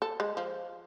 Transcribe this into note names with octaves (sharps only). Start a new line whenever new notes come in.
A4
G#3
F3